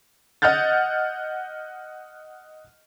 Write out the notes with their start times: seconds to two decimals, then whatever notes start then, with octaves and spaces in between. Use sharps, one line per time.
0.42 D#5 F#5 F6 G6 A6